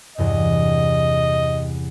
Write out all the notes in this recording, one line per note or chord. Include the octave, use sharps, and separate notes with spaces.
E2 G2 C3 D#5